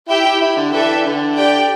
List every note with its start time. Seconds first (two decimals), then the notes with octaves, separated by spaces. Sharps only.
0.09 E4 G4 E5 G5
0.25 E4
0.42 E4
0.56 D3
0.72 E3 D4 A4 E5 G5
1.05 D3
1.37 G4 D5 G5